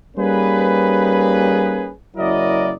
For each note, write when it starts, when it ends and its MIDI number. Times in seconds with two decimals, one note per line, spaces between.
0.17 1.91 55
0.17 1.91 58
0.17 1.91 61
0.17 1.91 63
0.17 1.91 68
0.17 1.91 71
2.17 2.73 30
2.17 2.73 54
2.17 2.73 64
2.17 2.73 70
2.17 2.73 74
2.17 2.73 75